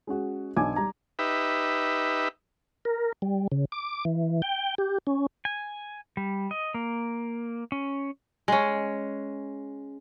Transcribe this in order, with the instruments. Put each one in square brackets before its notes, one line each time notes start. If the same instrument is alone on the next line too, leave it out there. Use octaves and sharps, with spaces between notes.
[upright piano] G#3 C#4 F#4
B1 D4 G#5 D6 G#6
G3 A#5
[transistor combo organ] D#4 G4 B4 E5
[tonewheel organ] A#4
G3
C#3
D6
E3
G5
G4
C#4
[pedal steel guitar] G#5
G3
D#5
A#3
C#4
[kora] G#3 C#4